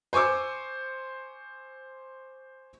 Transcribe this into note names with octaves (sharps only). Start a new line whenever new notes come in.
C5 G#5 C#6 D6 E6